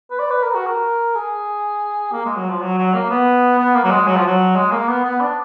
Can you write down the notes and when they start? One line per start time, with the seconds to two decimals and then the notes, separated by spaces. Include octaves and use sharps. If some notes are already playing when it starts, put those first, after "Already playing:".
0.11 B4
0.19 D5
0.31 B4
0.43 A#4
0.55 F#4
0.67 A#4
1.15 G#4
2.12 A#3
2.25 G#3
2.37 F#3
2.50 F3
2.62 F#3
2.77 F#3
2.94 A#3
3.10 B3
3.59 B3
3.75 A#3
3.84 F#3
3.91 G#3
4.07 F#3
4.17 F3
4.27 F#3
4.56 G#3
4.72 A#3
4.88 B3
5.05 B3
5.21 D4